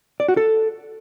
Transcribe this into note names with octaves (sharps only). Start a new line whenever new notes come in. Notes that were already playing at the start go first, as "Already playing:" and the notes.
D5
F#4
A4